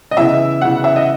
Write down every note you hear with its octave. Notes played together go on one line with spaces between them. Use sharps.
D#5
C#3 E3 B3 E4 E5
C#3 E3 B3 E4 F#5
E5
D#5